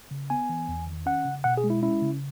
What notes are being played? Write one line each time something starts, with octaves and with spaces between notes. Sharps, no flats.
C#3
B3 G#5
E3
E2
D#3
C#4 F#5
C#3
B2 F#5
G#4
G#3
E4
C#4 E4
C#3